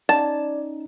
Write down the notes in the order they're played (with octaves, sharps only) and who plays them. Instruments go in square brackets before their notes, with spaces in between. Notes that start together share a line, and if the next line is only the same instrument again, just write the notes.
[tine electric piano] C#4 D#4 [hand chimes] D5 [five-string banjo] A5